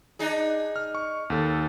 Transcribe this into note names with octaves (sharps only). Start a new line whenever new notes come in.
D4 D#4 G#4
F6
C#6
D#2 A4